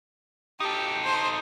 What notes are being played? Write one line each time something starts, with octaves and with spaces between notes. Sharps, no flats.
D#4 G4 A4
C5